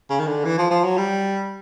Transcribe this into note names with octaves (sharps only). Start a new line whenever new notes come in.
C#3
D#3
D3
E3
F3
F3
F#3
G3